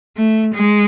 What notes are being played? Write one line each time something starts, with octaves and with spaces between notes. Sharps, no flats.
A3
G#3